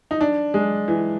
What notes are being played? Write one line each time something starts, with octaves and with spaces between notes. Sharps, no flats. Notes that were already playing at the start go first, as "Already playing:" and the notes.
D#4
D4
G#3
E3